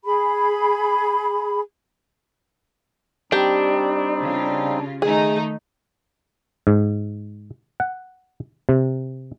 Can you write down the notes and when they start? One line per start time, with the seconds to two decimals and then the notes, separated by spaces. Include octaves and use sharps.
0.05 G#4 B5
3.32 G3 C4 D4 D#4 G4
4.20 C#3 F4
5.02 D#3 A3 D#4 G#4
6.67 G#2
7.80 F#5
8.69 C3